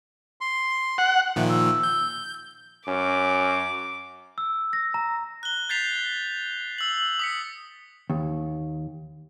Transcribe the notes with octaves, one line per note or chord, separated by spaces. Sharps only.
C6
F#5
A#2 D#3 F3 E5
E6
G6
F#2 C#4 D6
E6
A#6
A#5
F#6 G7
G6 A6 B6 C7 F7
E6 F#7
D#6 B6 C#7
D#2